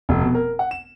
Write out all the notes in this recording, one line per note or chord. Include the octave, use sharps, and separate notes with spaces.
F1
B2
A#4
F#5
E7